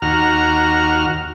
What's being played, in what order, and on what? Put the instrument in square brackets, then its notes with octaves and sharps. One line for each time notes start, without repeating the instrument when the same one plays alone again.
[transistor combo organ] D#2 F#4 F6 [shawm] A#5